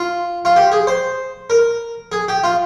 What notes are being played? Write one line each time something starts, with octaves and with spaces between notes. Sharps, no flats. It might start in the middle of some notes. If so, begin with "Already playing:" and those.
Already playing: F4
F4
G4
G#4
C5
A#4
G#4
G4
F4